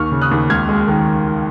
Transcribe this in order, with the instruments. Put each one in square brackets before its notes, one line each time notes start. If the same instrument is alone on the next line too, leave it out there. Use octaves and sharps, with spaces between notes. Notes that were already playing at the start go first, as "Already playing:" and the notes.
Already playing: [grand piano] D#2 C#6 F6
C#3
D#6 F#6
D#2
C#2 F6 G#6
G#3
D#3